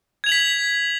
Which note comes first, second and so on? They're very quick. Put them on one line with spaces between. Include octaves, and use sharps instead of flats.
G#6 F7 F#7 B6